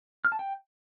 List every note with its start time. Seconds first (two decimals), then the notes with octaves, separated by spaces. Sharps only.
0.25 F6
0.32 A5
0.39 G5